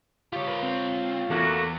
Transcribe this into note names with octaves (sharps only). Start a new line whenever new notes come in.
F4 G4 C#5
A#4 B4
C4
E2 A3 A#3 F#4